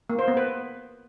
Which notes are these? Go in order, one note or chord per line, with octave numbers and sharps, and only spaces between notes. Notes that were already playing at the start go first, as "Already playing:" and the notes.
A#3
C5
B3
B4